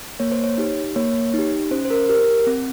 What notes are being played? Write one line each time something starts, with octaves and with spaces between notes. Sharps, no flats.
A#3 C#5
C5
C#5
D#4 G4
A#3 C#5
D#4 G4
C#4 C5
C5
A#4
G4 A#4
C4